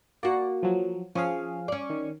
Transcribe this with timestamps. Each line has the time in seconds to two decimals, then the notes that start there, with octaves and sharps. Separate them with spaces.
0.23 A#3 F#4 D5
0.63 F3 F#3
1.15 F3 C#4 G#4 F5
1.68 C#4 D5
1.90 D#3